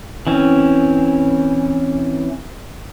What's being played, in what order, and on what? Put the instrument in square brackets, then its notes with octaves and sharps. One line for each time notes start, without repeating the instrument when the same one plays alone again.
[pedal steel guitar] E3 C4 C#4